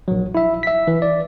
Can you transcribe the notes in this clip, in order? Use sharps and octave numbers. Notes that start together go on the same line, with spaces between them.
A#1 F#3
E4 E5
E5 B6
E3
D5